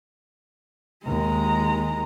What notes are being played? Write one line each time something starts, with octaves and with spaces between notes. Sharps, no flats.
D#2 G#3 A#5